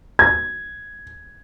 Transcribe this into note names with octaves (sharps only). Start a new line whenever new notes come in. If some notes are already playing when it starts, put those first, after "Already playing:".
G#6